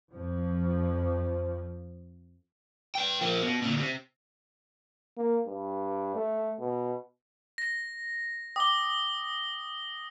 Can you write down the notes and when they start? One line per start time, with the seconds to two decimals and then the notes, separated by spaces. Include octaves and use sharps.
0.13 F2 F3
2.95 B4 G5
3.21 F3 A#3
3.42 B2
3.62 D2 A#2
3.78 C3
5.17 A#3
5.47 G2
6.15 A3
6.59 B2
7.58 A#6
8.56 G5 D6 D#6 G7